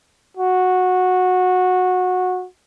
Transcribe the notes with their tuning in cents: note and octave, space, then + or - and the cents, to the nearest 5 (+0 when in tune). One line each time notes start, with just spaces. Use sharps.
F#4 -15